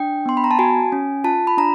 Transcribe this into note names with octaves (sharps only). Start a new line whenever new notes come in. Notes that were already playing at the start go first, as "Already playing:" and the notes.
Already playing: D4 G5
B3 C6
B5
A#5
A5
F#4 G#5
C#4
F4 A5
B5
D4 A#5